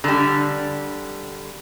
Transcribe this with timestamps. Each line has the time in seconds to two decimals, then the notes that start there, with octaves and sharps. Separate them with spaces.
0.04 D3 G3